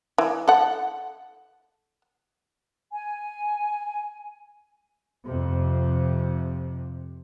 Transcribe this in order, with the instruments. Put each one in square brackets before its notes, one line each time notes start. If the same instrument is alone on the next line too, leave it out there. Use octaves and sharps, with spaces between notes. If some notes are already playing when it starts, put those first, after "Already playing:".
[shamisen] E3
A4 F#5
[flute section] G#5
[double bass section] F2 C3